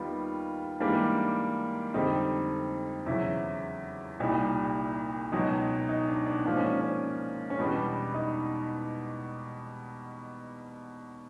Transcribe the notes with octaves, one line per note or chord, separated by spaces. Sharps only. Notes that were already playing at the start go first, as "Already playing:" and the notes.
Already playing: D#2 D#3 G3 B3 F4
G#2 E3 G3 A#3 D4
F2 D3 G3 C4 D#4
E2 C#3 F#3 E4
C2 A#2 G3 D#4
C#2 B2 F#3 D#4
D#4
D4
D4
G#2 F3 A#3 D4
C#4
C#4
C#4
E2 B2 G3 B3 D4
D#4